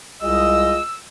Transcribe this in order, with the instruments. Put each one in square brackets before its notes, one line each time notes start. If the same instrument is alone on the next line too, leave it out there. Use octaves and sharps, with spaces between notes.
[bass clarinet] C2 [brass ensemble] G#3 F4 D#5 [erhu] E6